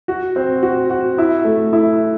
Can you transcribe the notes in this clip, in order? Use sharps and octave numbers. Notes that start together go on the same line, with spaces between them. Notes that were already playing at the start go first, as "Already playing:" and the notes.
F#4
C4
F#4
F#4
E4
A3
E4